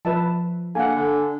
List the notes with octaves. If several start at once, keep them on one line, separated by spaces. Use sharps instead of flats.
F3 B4 E5 A5
A#3 D4 A4 F#5 G#5
D3